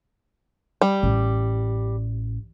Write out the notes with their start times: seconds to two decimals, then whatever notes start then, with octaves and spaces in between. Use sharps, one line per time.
0.81 G3
1.03 A1